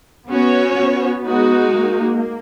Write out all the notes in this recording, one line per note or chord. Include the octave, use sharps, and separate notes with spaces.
B3 C#4 F#4 C#5
B3
G#3 D#4 F#4
A#3